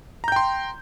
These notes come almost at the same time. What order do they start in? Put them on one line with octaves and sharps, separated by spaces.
A#5 G6 G5 C6